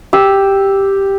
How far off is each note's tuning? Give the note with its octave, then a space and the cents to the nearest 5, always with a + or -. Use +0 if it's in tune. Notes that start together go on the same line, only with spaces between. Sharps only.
G4 +0 E6 +0